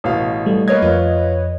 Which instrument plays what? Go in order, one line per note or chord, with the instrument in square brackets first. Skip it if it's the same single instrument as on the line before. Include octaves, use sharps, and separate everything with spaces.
[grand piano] A1 B2 F5
[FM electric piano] G3 A3
[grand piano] A#3 G#6 [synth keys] B4 C#5 D#5
[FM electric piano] F2 [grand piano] F4